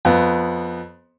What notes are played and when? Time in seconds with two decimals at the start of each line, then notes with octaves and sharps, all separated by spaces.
0.05 F2 B3